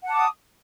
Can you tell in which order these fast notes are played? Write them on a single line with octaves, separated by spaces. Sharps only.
F#5 A5 D6 D#6